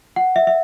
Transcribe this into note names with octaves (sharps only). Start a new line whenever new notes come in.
F#5
E5
E5